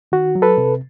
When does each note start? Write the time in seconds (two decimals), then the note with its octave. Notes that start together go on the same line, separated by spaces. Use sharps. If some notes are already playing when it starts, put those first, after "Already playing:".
0.12 D#3 F#4
0.35 F#3
0.42 A4 B4
0.58 C3